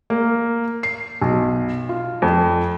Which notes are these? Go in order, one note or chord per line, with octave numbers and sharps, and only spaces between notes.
A#3
C7
B1
F4
F2